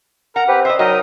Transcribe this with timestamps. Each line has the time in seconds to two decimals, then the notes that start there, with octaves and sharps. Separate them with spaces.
0.36 A#4 F#5 A#5
0.48 C4 G4 B4
0.65 C5 D#5 E5
0.79 F#3 D#4 A#4 D#5 D#6